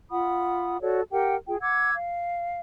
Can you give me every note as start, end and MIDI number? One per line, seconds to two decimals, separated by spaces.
0.11 0.81 65
0.11 0.81 78
0.11 0.81 83
0.11 0.81 87
0.81 1.01 66
0.81 1.01 69
0.81 1.01 73
0.81 1.01 74
1.11 1.36 67
1.11 1.36 70
1.11 1.36 78
1.11 1.36 79
1.47 1.56 65
1.47 1.56 68
1.47 1.56 79
1.61 1.94 78
1.61 1.94 86
1.61 1.94 88
1.61 1.94 92
1.95 2.61 77